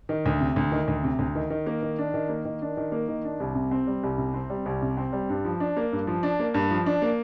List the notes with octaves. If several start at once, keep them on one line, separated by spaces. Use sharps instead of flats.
D#3
D2
C3
D2
D#3
D2
C3
D2
D#3
D#3
A#3
D#3
D4
D#3
A#3
D#3
D4
D#3
A#3
D#3
D4
C2
C3
C4
G3
C2
C3
C4
G3
C2
C3
C4
G3
G2
F3
D4
A#3
G2
F3
D4
A#3
G2
F3
D4
A#3